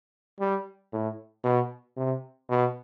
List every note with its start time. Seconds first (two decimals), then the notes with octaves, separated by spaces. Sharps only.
0.40 G3
0.93 A2
1.44 B2
1.97 C3
2.49 B2